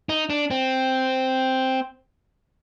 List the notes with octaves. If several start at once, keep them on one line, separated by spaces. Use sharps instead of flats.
D#4
D4
C4